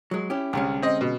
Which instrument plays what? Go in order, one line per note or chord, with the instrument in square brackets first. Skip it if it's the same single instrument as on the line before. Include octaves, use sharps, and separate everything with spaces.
[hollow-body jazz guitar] F#3 G#3
C#4 E4 G4
[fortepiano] C2 [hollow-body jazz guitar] D3 G#3 C#4
[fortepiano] C4 D#5
B2